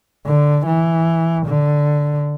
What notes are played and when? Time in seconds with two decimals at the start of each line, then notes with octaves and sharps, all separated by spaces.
0.26 D3
0.66 E3
1.46 D3